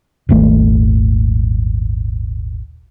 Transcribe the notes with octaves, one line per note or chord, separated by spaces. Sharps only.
D#1 G#1 A3